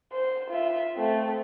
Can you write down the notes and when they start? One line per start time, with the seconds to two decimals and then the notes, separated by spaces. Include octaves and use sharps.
0.13 C5
0.51 F4 E5
0.96 A3 C4